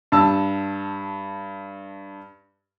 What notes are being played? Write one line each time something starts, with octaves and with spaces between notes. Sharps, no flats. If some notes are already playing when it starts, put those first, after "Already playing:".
G2 A5 E6